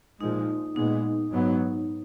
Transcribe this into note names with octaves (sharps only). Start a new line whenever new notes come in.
A#2 F3 G#3 D#4
A#2 G#3 B3 D#4
G#2 F#3 B3